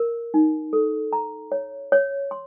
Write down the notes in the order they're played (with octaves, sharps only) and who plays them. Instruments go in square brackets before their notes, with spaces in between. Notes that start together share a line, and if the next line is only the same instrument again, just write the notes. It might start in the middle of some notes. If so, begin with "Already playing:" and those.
Already playing: [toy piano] A#4
D#4
A4
A#5
C#5
C#5
C6